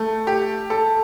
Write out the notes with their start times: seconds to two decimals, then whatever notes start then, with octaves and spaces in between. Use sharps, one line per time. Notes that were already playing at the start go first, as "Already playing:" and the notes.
Already playing: A3
0.27 G4
0.70 A4